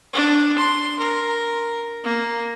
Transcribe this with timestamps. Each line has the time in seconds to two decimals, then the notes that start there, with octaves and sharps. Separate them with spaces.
0.13 D4
0.58 C6
0.99 A#4
2.04 A#3